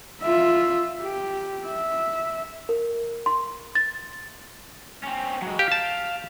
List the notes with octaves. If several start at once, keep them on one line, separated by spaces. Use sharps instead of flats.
F4 E5
G4
E5
A#4
C6
A6
C4 C#4
F#3 G#3
G4 F5
A5